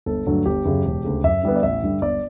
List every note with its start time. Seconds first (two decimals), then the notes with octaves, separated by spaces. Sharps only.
0.06 G1 A4
0.26 G2 D3 F#3 A3
0.46 G1 G4
0.65 F#2 C#3 F#3
0.85 E1
1.04 D2 C#3
1.24 F#2 E5
1.43 D3 G3 B3
1.56 D5
1.63 A1 E5
1.82 G2 D3 G3
2.02 G1 D5